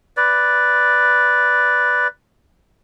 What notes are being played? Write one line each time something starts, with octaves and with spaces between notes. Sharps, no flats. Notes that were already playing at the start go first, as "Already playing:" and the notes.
B4 D5